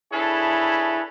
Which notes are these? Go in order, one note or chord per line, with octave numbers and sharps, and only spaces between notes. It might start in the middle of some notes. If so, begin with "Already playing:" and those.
D4 E4 G#4 A4 B4 C#5